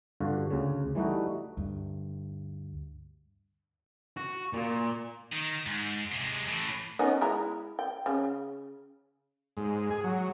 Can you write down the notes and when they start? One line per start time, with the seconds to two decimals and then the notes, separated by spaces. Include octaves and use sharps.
0.20 G2 D3 F4 F#4
0.51 D2 C#3
0.95 E3 G3 A3 D#4 F#4
1.57 D2 G2
4.17 F#4
4.53 A#2
5.32 D#3
5.66 G#2
6.12 C3 G#3
6.47 A2 E3
6.99 B3 C#4 D#4
7.21 G#3 E4 A#5
7.79 G5
8.06 C#3
9.57 G#2
9.91 G#4
10.04 F#3